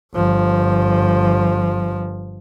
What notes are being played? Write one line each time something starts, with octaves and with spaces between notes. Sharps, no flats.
G1 F3